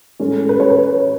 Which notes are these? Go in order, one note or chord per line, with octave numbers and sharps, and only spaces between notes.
A2 G#3 C#4
B4
C#5
B4